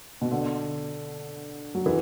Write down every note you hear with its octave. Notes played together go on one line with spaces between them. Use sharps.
B2
D3
F#3
E3